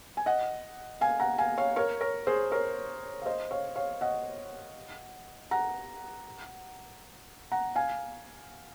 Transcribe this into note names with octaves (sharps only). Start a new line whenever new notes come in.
G#5
D#5 F#5
F5 G#5
F#5 A#5
F5 G#5
C#5 F5
A#4 C#5
A#4 C#5
G#4 C5
A#4 C#5
F5
C5 D#5
C#5 F5
C#5 F5
D#5 F#5
F#5 A#5
F#5 A#5
F5 G#5